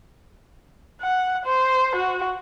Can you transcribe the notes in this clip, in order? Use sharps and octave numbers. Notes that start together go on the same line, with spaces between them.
F#5
C5
F#4